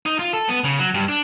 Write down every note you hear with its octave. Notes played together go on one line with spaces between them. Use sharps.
D#4
F4
A4
B3
C#3
F#3
G2
D4